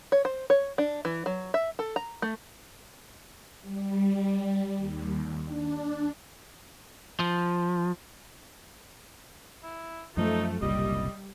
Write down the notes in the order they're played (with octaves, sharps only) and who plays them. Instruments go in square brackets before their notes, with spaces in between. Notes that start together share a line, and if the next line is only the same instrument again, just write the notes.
[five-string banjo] C#5
C5
C#5
D4
E3
F#3
E5
A4
A#5
A3
[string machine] G3
D#2
D4
[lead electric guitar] F3
[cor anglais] E4
[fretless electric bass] F#2 F3 [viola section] A3 [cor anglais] D#4
[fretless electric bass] F#1 C2 A#2 [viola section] G3 [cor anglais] D#5